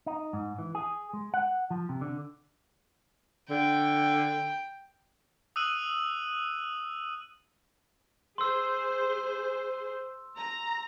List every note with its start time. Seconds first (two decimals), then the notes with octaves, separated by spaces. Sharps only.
0.06 D#4
0.33 G#2
0.58 E3
0.75 G#4
1.13 G#3
1.34 F#5
1.71 F3
1.89 C3
2.01 D3
3.50 D3 G5
5.56 D#6 E6 F#6 D#7 F#7
8.38 G#4 C5 C6 E6
10.37 A#5